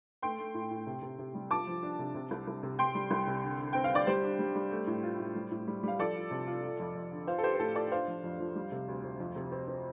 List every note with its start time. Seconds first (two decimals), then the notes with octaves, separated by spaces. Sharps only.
0.22 A3 G5 C6
0.38 A3
0.54 A2
0.71 A2
0.86 C3
1.02 C3
1.19 C3
1.35 G3
1.51 F4 A5 D6
1.67 F3
1.83 D4
1.99 C3
2.15 C3
2.31 C2
2.47 C2
2.63 C3
2.79 C3 G5 C6
2.95 G3
3.11 C2
3.27 C3
3.44 D3
3.59 D3
3.73 C4 G5
3.84 F5
3.91 D3 D5
4.07 G3 G4 C5
4.23 D4
4.39 G3
4.55 G3
4.71 A3
4.87 A2
5.03 F4
5.20 A2
5.35 G3
5.51 A2
5.67 G3
5.83 G3 F5
5.99 F3 A4 D5
6.16 F4
6.31 C3
6.47 F4
6.63 F4
6.79 F2
6.95 F2
7.11 D3
7.27 F4 C5 F5
7.38 A4
7.44 F4 G4 C5
7.55 C5
7.59 A2 A4
7.75 F4 A4 D5
7.92 D4 C5 F5
8.08 F3
8.24 F2
8.40 F3
8.55 G3
8.72 C3
8.88 D2
9.04 D2
9.20 F2
9.36 C3
9.52 C4
9.68 C4